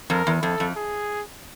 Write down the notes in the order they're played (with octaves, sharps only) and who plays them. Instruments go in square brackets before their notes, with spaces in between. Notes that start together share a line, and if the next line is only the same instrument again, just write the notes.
[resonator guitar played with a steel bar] F2 [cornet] A#4
[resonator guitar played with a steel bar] E2
[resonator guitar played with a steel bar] F2 [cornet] A4
[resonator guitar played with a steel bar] F2
[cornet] G#4